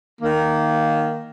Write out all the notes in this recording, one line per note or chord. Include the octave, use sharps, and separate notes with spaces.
D#3 A#3